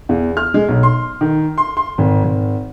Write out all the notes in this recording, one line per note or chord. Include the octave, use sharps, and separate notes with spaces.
E2
F6
G#3
B1
C6
D#3
C6
C6
G#1
G#1